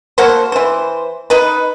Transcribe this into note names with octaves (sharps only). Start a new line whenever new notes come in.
A#3 F#4 A4 C5
E3 C5
D#4 B4